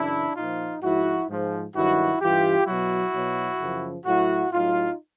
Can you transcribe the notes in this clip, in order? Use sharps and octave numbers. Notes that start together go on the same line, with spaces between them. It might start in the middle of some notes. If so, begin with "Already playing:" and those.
Already playing: F#2 C#3 E3 D4 E4
A#2 F3 D#4 F4
G#2 F3 E4 F#4
G#2 F3
G2 D#3 F#3 E4 F#4
G2 E3 F4 G4
B2 F#3 E4 F#4
B2 F#3
F#2 C#3 F3
A2 F#3 E4 F#4
A2 F#3 D#4 F4